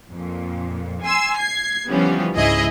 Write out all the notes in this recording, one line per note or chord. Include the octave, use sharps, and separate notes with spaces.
F2 A#2
G#5 C6 E6
G#6 C7
D3 E3 F3 G3 B3 C#4
C#2 G#2 E4 G#4 D#5 E5